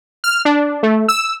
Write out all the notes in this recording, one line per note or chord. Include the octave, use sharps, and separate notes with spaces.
F6
D4
A3
E6